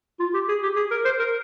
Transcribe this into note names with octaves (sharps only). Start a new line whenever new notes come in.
F4
G4
G#4
G4
G#4
A#4
C5
A#4